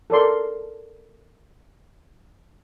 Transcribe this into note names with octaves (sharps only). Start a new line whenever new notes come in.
A4 A#4 D5 C6